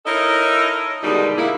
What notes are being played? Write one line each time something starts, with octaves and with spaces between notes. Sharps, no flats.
D#4 E4 A4 A#4 C#5 D#5
B2 D3 D#3 G3 G#3 D#4
A#3 E4